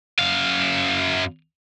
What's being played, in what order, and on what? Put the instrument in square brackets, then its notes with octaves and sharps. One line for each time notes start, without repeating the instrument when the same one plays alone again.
[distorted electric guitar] F#2 F5